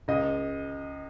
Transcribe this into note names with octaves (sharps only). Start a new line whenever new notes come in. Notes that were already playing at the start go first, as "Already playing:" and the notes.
C#2 D#5